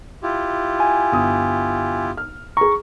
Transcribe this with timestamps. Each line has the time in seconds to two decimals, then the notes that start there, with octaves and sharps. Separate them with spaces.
0.23 E4 F4 G4
0.80 G#5
1.12 G1 D#6
2.17 F6
2.57 G#4 A#5 C#6